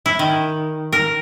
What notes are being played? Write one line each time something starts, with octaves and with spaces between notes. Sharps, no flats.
E4
D#3
A#4